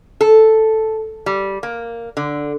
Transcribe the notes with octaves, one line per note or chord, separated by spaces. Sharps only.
A4
G3
A#3
D3